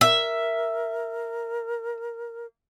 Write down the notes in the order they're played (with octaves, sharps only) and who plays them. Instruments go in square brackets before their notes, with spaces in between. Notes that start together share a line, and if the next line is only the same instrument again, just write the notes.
[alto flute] A#4 [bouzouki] E5